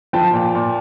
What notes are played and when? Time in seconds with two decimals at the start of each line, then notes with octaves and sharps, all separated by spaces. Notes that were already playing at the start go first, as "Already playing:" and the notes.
0.13 F3 G5 A5
0.33 A#2
0.55 A#2